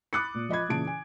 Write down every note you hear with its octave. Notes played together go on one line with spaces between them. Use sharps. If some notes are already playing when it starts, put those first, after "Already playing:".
B5 D6 D#6 F#6 A6 C#7
A#2
F3 D#5 B5 G#6
A#2 C#3 E3 A5 D7
G#5